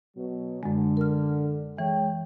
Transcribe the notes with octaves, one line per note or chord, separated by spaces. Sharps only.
B2 F#3
F#2 D3 G#3
A#4 F6
E3 G#3 C#5 G5